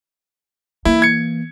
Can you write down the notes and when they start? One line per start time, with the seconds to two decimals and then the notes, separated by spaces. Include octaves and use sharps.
0.85 E3 A#3 E4
1.02 G#6 C#7